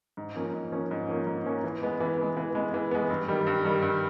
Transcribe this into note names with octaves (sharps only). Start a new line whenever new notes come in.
G#2
F3 A#3 C#4
G#2
F3 A#3 C#4
G#2
F3 A#3 C#4
G#2
F3 A#3 C#4
E3
G#3 B3
E3
G#3 B3
E3
G#3 B3
E3
G#3 B3
G2
D#3 G3
G2
D#3 G3
G2